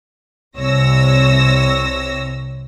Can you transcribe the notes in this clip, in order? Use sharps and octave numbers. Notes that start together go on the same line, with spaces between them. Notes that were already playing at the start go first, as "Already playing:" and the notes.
C2 C3 C#5 E6 A#6